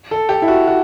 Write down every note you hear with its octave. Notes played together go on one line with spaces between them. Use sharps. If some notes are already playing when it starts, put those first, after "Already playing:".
A4
G4
E4
F#4
F#4